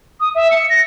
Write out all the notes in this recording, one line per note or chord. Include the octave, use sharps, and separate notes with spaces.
D#6
E5
C#7
A#6